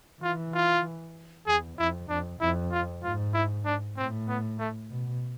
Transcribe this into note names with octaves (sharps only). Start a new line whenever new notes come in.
E3 F4
F4
E2 G#4
F2 E4
F2 D4
F2 E4
F4
G#2 F4
E4
D4
A2 C4
B3
A3
B2